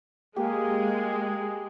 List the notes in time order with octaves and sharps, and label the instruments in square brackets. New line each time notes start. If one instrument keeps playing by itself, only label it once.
[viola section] G#3 [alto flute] A#3 [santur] G4 [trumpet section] G#4